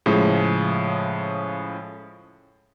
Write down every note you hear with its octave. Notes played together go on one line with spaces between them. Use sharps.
A2 C#3 F3 G#3